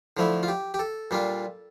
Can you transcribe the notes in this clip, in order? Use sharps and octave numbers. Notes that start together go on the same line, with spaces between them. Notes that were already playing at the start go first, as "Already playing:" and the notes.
D3 F3 A3 E4
F4
G4
G4
A4
A#2 G3 D4 F4